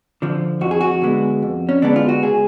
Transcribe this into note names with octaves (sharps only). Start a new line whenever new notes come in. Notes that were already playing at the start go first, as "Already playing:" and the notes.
D3 F3
F2 F#4
G#4
F#4
D3 G#3 B3
F2
C#4
D3 G#3 B3 D4
F4
F#4
C#2 G#4